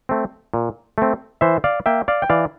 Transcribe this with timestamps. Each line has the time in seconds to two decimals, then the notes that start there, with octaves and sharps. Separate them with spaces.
0.09 A3 C4
0.54 A#2
0.98 A3 C4
1.41 E3 C5 E5
1.64 D5 F5
1.86 A#3 E5 G5
2.08 D5 F5
2.22 G5
2.29 E3 D5 F5